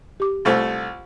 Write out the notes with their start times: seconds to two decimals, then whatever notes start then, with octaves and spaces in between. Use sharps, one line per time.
0.20 G4 D6
0.45 C2 A3 F4 C5